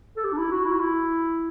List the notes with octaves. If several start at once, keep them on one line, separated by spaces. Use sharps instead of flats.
A4
G4
D4
E4
F#4
E4
F#4
E4